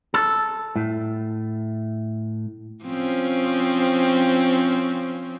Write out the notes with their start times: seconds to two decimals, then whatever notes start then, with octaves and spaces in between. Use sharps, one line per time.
0.14 A4
0.76 A2
2.85 F3 C4 C#4